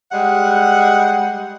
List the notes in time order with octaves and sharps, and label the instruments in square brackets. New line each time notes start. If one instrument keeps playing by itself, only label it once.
[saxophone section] G3 G#3 D#5 F#5